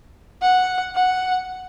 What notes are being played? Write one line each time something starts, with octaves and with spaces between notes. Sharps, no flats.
F#5
F#5